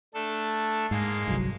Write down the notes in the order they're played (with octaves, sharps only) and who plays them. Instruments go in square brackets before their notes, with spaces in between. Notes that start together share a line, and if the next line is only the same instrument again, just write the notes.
[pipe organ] A3 D4 A4
[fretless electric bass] G#2 [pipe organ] G#3 A#3 F5
[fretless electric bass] G1 C2 F#3